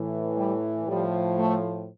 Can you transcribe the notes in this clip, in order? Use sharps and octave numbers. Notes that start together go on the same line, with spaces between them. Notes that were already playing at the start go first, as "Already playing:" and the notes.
Already playing: A2 E3
G3
A2 F3 G3
A3